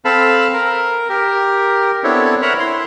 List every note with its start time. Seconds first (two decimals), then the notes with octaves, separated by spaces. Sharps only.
0.05 C4 A4 F5 A5 B5
0.54 A#4
1.09 G4 A#4
2.04 B3 C4 D4 E4 A4 C#5
2.42 A#4 C#5 E5 F#5 A#5 B5
2.60 E4 C6